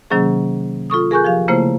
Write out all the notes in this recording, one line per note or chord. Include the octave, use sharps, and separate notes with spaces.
C3 D#3 F#3 A#3 C#4 G#4
F4 A4 C#6 D#6
G#4 A#4 G#5 C#6 F#6 G6
F3 G4 F5
C#3 A3 A#3 E4 C5